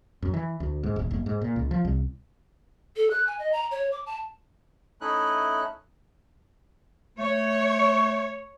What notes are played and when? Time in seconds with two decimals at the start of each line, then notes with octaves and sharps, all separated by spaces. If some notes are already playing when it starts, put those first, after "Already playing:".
0.22 F#2
0.34 E3
0.60 D2
0.83 G#2
0.96 D1
1.11 F#1
1.26 G#2
1.41 A#2
1.56 C#2
1.71 F3
1.85 C2
2.96 A4
3.11 F#6
3.27 G#5
3.39 D#5
3.52 A#5
3.71 C#5
3.92 D6
4.06 A5
5.01 A3 C#4 D#4 E4 F#6
7.18 A3 C#5